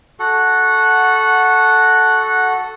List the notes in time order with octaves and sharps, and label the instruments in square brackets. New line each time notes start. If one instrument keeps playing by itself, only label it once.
[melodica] F#4 A4 F#5